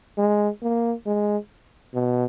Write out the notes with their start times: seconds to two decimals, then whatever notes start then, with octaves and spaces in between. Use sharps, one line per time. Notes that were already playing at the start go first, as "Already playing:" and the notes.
0.18 G#3
0.62 A#3
1.06 G#3
1.94 B2